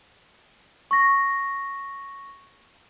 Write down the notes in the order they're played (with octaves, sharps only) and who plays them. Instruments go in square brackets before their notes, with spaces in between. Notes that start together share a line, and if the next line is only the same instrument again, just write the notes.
[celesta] C#6 A#6